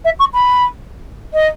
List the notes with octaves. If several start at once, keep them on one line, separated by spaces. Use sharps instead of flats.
E5
C#6
B5
D#5